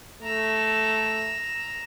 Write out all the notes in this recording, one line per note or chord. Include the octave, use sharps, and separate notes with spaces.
A3 A#5 E6